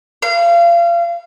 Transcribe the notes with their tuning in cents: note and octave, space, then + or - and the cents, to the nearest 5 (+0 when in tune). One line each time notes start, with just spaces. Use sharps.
F5 -30